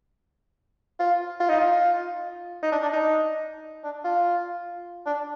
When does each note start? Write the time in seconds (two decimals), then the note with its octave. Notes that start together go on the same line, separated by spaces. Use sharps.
0.99 F4
1.40 F4
1.49 D#4
1.59 F4
2.62 D#4
2.72 D4
2.82 D4
2.93 D#4
3.84 D4
4.04 F4
5.06 D4